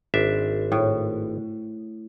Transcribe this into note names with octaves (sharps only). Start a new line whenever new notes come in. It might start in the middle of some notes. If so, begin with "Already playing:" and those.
G#1 D4 E5
A2